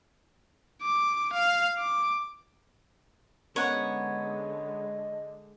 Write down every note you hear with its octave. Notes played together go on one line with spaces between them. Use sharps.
D6
F5
D6
D3 G#3 B3 C#4 A#4 C#5 D#5 F#5